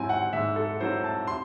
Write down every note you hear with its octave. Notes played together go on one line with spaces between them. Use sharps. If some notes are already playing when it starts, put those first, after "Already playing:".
Already playing: G#2 F#3 C4 E4 G#5
F#5
G#2 E5
A4
F#3 C4 E4 C5
A5
C6